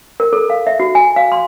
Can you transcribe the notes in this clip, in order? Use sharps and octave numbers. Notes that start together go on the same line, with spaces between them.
A#4
A4
F5
E5
F#4
G#5
F5
C6